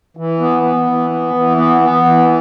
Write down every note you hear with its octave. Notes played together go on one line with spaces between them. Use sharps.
E3
B3
B3
E3
B3
E3
B3
B3
E3